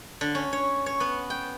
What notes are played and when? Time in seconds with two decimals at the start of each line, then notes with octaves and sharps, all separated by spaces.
0.21 D3
0.35 C#4
0.53 C#5
0.86 C#5
1.00 B3
1.30 G5